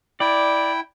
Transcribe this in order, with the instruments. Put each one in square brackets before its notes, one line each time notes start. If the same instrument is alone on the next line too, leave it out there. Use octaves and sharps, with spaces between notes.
[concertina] E4 G5 [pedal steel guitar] D5